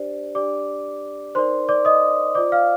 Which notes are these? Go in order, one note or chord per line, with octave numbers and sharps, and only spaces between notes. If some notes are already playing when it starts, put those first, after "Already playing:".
Already playing: D4 G4 C5 D5
D4 G4 D5 D6
D#4 A#4 C5 D5 C6
D5 D6
D#5 D#6
F4 C5 D5 D6
F5 F6